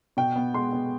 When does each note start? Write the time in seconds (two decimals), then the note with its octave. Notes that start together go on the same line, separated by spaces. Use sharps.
0.17 B2 G5
0.36 B3
0.54 G#3 C6
0.73 B3